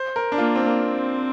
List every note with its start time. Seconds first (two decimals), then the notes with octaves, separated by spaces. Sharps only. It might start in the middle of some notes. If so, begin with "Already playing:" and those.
Already playing: C5
0.16 A#4
0.32 D4
0.38 A#3 F4
0.56 C4
0.61 D4
0.83 C4